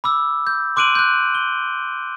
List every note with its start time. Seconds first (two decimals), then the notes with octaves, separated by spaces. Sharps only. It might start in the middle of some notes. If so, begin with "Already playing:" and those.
0.04 B5 D6 E6
0.47 G6
0.76 C6 D6 F#6 D7 D#7 F#7
0.95 F#6 G6
1.35 G7